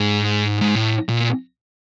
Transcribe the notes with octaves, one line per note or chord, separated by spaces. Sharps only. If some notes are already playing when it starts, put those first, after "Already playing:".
Already playing: G#2
G#2
A2
A#2